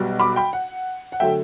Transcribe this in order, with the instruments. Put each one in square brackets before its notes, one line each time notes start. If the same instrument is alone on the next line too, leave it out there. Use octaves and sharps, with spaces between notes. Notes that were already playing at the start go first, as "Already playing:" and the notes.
Already playing: [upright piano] B1 B2 G3
B5 D6
G5 B5
F#5
F#5
D3 F#3 A3 E5 G5